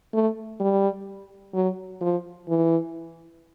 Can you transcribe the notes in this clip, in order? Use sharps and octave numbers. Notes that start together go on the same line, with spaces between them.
A3
G3
F#3
F3
E3